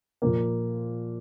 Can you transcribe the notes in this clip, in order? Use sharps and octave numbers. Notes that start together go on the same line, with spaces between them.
A#2 F3 A#3